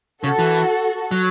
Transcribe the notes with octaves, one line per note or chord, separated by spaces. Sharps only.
C#3 F#4 A4
E3
F#3